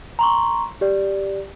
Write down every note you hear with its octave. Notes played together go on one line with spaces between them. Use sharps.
A#5 C6 C#6
G4 D5